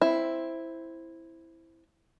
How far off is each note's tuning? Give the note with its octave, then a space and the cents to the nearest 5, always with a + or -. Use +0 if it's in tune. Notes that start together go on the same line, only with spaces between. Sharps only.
C4 +0 E4 +0